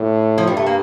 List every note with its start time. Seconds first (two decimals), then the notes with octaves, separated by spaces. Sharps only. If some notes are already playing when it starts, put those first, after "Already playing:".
Already playing: A2 D4
0.38 F3
0.47 G2 G3
0.57 A3
0.66 A#3